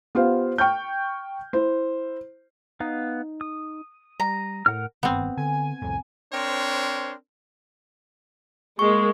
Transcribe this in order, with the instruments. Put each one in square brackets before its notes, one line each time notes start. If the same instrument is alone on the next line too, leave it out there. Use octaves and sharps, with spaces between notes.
[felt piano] B3 F4 G4 C5 F5
G5 C#6 F6 G6
E4 C5
[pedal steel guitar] B3 F5 [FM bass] D#4
[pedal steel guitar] D#6
[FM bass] G3 [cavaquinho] A#5
[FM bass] A2 [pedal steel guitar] A#4 F#5 F6
[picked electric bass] F#1 G2 D#3 [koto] B3 C4
[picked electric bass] D3 [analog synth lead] G#5
[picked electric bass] C2 F2 A2
[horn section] C4 D4 A#4 C5 C#5
[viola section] G#3 A#3 [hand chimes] C#6